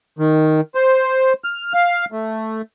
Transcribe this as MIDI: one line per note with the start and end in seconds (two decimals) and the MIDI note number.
0.19 0.61 51
0.75 1.33 72
1.44 1.73 89
1.74 2.05 77
2.12 2.62 57